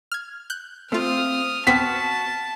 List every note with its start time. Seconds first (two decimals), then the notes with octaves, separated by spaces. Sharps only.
0.12 F6 G#6
0.50 F#6 G6
0.92 A3 C4 F4 F5 D#6 F6
1.67 B3 C4 F#4 A5 F6 B6 C7